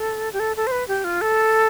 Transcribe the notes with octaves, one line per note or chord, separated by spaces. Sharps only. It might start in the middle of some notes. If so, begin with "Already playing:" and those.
Already playing: A4
G4
A4
A4
C5
B4
G4
F4
A4